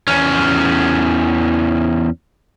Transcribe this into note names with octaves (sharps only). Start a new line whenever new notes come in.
E2 C#4